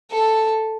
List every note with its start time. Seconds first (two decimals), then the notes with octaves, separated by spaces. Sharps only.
0.11 A4